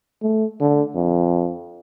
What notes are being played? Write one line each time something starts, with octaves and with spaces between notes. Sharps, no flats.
A3
D3
F2